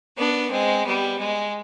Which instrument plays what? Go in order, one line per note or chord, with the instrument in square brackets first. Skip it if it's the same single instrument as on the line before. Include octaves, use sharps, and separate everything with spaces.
[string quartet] B3 D4
G#3 C4
G3 B3
G#3